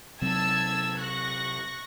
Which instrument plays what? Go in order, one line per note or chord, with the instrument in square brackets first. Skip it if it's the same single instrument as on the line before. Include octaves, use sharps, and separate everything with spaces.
[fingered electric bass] C3 F#3 C4 [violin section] A5 E6 G#6
[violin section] C#6 F#6 A#6